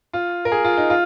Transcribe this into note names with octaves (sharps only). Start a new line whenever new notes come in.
F4
A#4
G#4
F4
D#4
F4